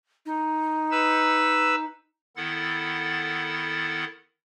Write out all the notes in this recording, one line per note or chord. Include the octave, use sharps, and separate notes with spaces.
D#4
B4 E6
D#3 B3 E4 A4 F#5 A6